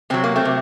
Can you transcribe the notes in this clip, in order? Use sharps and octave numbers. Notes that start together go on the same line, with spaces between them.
C3 F#3 C4
A#3
A3 C4
C3